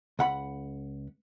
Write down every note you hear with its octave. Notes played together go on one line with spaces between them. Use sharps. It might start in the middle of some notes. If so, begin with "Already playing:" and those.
C#2 F#5 B5